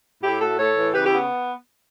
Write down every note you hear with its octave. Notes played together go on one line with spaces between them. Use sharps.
A2 E4 G4
A3 F#4 A4
A2 A4 C#5
E3
C#3 G4 B4
E4 G4
B3